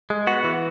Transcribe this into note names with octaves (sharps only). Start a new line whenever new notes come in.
G#3
B3 F#4
E3